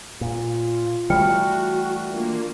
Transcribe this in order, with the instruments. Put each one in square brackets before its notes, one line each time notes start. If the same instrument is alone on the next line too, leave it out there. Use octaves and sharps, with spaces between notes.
[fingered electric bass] A#2 [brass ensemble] F4
[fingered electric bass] E3 G3 A3 [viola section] F#4 [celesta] G5 F6 C#7
[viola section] A#3 [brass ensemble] D4 F4